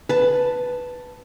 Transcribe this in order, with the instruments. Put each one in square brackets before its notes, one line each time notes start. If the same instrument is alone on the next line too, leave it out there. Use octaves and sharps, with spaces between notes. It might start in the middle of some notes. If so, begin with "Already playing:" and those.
[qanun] B4 A5